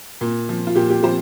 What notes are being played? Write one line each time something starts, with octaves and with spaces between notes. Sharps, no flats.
A#2
F3
F4
A#2 G4
G4
F3 G4 C5